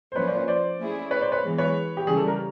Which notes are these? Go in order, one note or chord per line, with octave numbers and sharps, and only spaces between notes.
C5
F3 A#3 C#4 B4 C#5
C5 D5
B4 C#5
C5 D5
A3 C#4 E4 G#4
B4 C#5
C5 D5
B4 C#5
E3 G#3 B3
B4 C#5
G4
C#3 E3 G3 G#4
A4
A#4